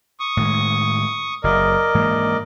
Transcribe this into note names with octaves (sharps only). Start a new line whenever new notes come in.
C#6 D#6
A2 D#3 G#3
F#1 A#4 D5 D#5
G#2 E3 A#3